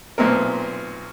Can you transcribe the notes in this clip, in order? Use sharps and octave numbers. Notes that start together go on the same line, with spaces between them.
B1 A#2 C4 A#4